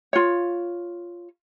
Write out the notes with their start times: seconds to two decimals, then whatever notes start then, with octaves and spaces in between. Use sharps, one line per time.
0.13 F4 C#5